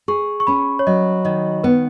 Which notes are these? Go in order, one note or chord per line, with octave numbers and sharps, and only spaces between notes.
G#4 C#6
C#6
C#4 B5
C#5
F#3 D#5
D#3 D#5
B3 B4